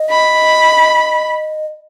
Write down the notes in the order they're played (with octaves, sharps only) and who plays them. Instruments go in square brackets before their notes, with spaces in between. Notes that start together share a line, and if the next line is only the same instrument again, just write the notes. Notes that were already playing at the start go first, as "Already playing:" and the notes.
Already playing: [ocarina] D#5
[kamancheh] B5